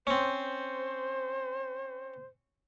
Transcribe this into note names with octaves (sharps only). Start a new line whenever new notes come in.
C4 C#4 C5